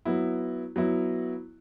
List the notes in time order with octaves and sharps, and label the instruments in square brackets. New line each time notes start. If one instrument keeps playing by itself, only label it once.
[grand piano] F#3 B3 E4
F#3 B3 E4